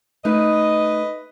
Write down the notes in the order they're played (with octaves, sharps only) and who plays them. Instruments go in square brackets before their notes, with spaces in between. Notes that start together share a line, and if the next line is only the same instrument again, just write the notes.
[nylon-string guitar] A3 D#4 [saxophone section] B4 D#5